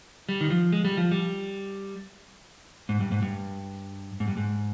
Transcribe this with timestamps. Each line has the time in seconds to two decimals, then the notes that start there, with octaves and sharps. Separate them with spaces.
0.29 G3
0.41 D#3
0.50 F3
0.72 G#3
0.85 G3
0.97 F3
1.11 G3
2.89 G#2
3.00 G2
3.12 G#2
3.22 G2
4.20 G#2
4.28 G2
4.37 G#2